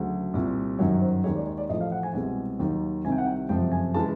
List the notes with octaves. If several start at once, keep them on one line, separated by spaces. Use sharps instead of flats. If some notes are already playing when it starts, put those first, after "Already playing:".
Already playing: D2 C#3 F#3
C2 A#2 G3
G1 F#2 D#3 F#3 C#5
C5
D#2 D#3 G#3 C#5
D5
C#5
D5
A1 A2 F3 A3 D#5
F5
F#5
G#5
C2 B2 G#3 G#5
D#2 D#3 F#3
C2 C3 D#3 G#5
G5
F#5
G5
F#1 F2 C3 F3 G5
G#5
C#3 E3 G#3 A5